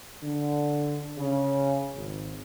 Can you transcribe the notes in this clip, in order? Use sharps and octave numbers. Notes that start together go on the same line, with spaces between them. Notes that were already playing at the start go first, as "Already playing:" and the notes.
D3
C#3
G#1